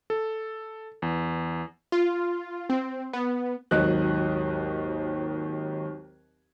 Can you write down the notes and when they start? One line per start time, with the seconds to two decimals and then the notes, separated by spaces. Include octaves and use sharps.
0.10 A4
1.02 E2
1.92 F4
2.70 C4
3.13 B3
3.71 G#1 D#2 F#3 D#5 F#6